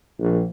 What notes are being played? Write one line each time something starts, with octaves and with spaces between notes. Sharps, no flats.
A#1